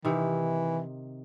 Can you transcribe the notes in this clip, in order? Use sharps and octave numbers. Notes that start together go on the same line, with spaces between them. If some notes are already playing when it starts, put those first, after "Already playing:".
C3 D#3 E3